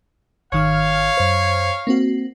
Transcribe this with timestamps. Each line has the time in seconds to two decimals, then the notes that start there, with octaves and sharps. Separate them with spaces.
0.52 G#1 D#3 C#5 F5 F6
1.17 F#2 C5
1.87 A#3 C4 F#4